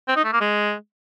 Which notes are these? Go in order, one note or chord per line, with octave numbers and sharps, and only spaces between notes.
C4
D#4
A3
A#3
G#3